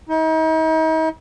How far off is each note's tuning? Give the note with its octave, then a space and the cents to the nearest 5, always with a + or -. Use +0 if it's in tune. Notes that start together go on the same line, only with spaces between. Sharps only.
D#4 +40